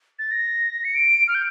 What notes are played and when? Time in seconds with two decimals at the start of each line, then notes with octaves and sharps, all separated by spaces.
0.19 A6
0.31 A#6
0.84 C#7
0.95 D7
1.28 F6
1.35 G6